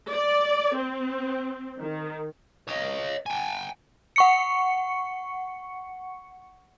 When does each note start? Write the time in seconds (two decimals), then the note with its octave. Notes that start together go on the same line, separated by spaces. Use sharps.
0.12 D5
0.75 C4
1.78 D#3
2.68 C#5 D#5
3.26 G5 G#5
4.16 F#5 C#6 C#7